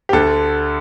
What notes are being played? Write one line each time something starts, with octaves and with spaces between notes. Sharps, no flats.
G4
D2 D3 A4